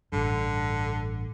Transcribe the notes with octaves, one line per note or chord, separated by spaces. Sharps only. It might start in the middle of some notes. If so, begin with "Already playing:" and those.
A1 G2 D3